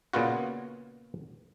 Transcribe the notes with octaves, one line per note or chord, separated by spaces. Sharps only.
A#2 C#3 B3 F4 F#4